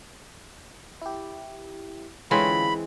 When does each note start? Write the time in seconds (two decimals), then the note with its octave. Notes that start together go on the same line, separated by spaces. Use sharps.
1.01 E4 G4
2.31 D3 E3 G#3 C4 C#4 F4 B5